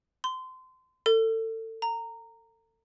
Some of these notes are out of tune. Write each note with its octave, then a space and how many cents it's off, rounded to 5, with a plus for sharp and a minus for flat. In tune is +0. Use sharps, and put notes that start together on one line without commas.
C6 -25
A4 +30
A#5 -15